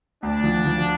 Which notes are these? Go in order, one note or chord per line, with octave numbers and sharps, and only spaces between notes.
D2 D4
F3
F3